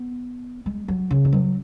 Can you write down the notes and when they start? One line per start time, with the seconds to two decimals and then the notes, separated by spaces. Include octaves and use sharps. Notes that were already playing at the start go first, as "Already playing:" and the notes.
Already playing: B3
0.66 G#3
0.88 F#3
1.11 C#3
1.25 D#3
1.33 F#3